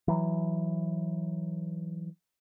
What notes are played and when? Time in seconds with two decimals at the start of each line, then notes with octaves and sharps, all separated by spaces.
0.08 E3 F#3